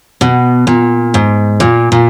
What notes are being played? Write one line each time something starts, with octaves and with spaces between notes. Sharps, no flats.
B2
A#2
G#2
A#2
A#2